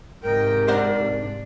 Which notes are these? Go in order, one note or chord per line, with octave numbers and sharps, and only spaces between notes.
G#2 C3 A#4 D#5 G5
D4 C5 D5 F#5